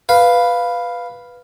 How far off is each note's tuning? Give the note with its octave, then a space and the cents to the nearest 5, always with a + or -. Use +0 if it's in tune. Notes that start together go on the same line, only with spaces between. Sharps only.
B4 +0 F5 +0